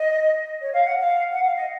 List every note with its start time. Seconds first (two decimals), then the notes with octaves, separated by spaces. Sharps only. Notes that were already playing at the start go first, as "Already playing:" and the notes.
Already playing: D#5
0.61 C#5
0.72 F5
0.84 F#5
0.97 F5
1.31 F#5
1.43 F5
1.54 D#5